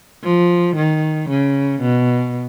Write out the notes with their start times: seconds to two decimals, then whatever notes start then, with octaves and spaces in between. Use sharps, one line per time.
0.23 F3
0.76 D#3
1.30 C#3
1.81 B2